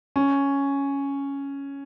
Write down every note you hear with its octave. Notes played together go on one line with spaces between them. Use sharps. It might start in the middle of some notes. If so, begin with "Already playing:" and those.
C#4